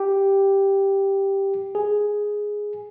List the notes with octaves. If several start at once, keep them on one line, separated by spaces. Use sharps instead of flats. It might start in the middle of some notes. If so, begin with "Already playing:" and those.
Already playing: G4
G#4